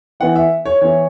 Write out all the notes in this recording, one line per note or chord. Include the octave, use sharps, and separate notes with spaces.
E3 B3 E4 F#5
E5
C#5
E3 B3 E4 C#5